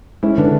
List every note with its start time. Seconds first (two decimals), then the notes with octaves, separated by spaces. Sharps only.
0.23 G#3 C#4 E4
0.38 D3 B3 D4